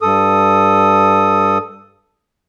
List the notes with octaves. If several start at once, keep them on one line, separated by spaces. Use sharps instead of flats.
G2 A4 D#6